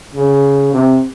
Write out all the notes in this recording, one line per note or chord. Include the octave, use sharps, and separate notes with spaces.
C#3
C3